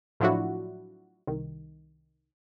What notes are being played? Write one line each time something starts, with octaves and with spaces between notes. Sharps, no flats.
A2 F3 F#3 D4 E4 F#4
C2 D#3